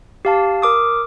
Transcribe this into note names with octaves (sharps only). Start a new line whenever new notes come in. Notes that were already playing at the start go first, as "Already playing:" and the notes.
G4 F5 A5
A#4 D6 D#6